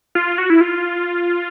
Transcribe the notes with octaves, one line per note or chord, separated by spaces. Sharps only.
F4
F#4
E4
F4